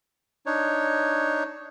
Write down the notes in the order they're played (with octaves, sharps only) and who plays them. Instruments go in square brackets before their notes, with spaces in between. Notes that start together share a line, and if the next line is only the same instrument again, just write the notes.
[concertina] D4 D#4 C#5